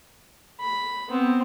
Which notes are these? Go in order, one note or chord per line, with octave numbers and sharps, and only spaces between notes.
B5
B3 C4